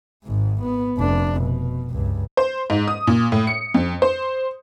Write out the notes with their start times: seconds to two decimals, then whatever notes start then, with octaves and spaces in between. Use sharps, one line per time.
0.24 G#1 G#2
0.62 B3
0.98 F1 D4
1.41 B2
1.92 C#2 G2
2.37 C5
2.70 G#2
2.88 D#6
3.07 A#2
3.32 A2
3.47 C#7
3.74 F2
4.02 C5